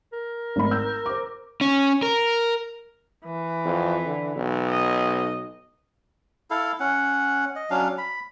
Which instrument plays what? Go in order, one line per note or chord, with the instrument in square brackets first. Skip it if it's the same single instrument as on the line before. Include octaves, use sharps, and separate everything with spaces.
[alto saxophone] A#4
[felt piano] G#1 A3 B5
E6 G6
C5 D6
[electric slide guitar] C#4
A#4
[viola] E3
[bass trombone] F2
D3
B1
[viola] D#5
[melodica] E4 A4 F5
C#4 F#5
D#5
F#3 C#4 D4 F5
B5